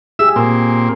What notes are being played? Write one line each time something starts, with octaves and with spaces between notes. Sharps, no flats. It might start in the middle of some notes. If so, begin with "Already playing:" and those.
G4 G#4 E5 E6
A#2 C4